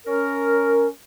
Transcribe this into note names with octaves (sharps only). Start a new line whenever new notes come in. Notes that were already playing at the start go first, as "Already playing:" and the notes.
C#4 A#4